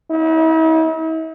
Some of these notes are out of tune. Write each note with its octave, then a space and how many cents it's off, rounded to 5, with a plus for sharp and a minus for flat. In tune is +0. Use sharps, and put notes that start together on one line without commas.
E4 -45